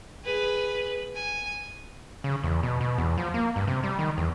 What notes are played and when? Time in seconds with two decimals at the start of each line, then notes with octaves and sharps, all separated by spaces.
0.25 G#4 B4
1.15 G#5
2.24 C#3
2.44 E2
2.63 B2
2.81 B2
2.98 E2
3.18 F3
3.34 A#3
3.56 G2
3.67 C3
3.83 G3
3.99 D#3
4.18 E2